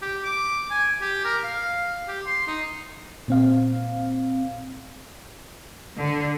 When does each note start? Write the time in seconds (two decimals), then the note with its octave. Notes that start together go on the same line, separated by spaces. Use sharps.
0.02 G4
0.24 D6
0.71 G#5
1.01 G4
1.24 A#4
1.44 F5
2.08 G4
2.26 C6
2.47 D#4
3.28 A#2 C4 F5
5.98 D3